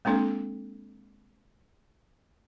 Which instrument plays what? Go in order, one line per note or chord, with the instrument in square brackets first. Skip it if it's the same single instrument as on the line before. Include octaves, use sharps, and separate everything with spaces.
[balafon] G#3 A#3 C4 D4 A4